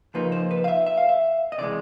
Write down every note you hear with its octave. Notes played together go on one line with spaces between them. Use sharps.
C#3 F3 A#3 D#4 B4
C5
B4
F5
E5
E5
F5
E5
D#5
C3 E3 G#3 D5